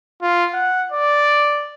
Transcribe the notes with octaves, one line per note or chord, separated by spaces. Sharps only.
F4
F#5
D5